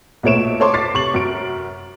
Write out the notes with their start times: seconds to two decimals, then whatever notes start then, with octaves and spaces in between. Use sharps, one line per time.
0.23 B1 A#2 A3 C#5 D7 E7
0.60 A4 C#5 C6 D6
0.74 D6 A6 B6 C7
0.94 C3 C#6 F#7
1.14 F#2 D7